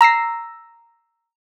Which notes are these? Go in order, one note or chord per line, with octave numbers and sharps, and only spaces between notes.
A#5 E6 A#6 C7